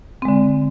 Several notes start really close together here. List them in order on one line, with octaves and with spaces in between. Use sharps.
C4 G#3 D3